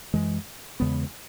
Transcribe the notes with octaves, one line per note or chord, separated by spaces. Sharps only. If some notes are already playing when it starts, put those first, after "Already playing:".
F#2 E3 G#3
E2 C#3 G#3 B3